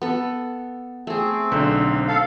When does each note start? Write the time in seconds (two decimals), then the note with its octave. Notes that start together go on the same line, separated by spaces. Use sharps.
0.02 B3 A4
1.07 A3 C4 G#4
1.52 B1 D3 C5
2.08 A4 F5